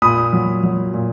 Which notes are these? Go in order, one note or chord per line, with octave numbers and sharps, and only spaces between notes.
A#2 B5 D#6
F#3
F#3
A#2